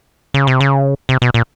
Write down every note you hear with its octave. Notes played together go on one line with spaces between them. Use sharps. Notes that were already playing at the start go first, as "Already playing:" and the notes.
C#3
C3
C#3
C3
B2
A#2